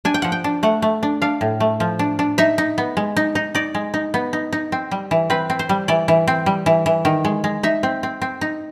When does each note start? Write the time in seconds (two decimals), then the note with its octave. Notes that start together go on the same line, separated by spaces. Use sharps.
0.05 D4 G#5
0.14 G5
0.22 F3 F#5
0.32 G5
0.44 D4
0.63 A3 F#5
0.82 A3
1.03 D4
1.22 D4 F5
1.41 A2
1.60 A3
1.80 F3
1.99 D4
2.19 D4
2.38 D#4 E5
2.58 D#4
2.78 B3
2.97 G#3
3.16 D#4
3.35 D#4
3.55 D#4 D5
3.75 G#3
3.94 D#4
4.14 B3
4.33 D#4
4.53 D#4
4.72 C4
4.91 G3
5.11 E3
5.30 C4 B4
5.50 C4
5.59 C5
5.69 G3
5.88 E3 D5
6.08 E3
6.28 C4
6.46 G3
6.66 E3
6.86 E3
7.05 D#3
7.25 G#3
7.44 G#3
7.63 D#4 E5
7.83 C4
8.03 C4
8.22 C4
8.41 D#4